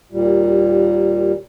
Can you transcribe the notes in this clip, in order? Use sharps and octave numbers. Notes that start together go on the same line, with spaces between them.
D#2 A#2 G3